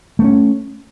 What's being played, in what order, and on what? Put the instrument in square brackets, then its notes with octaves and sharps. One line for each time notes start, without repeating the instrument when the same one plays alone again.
[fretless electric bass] A3
A#3
C#4